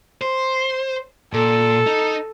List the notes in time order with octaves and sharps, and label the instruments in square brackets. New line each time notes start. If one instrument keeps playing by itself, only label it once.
[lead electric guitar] C5
[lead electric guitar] A#2 [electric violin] A4
[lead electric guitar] D#4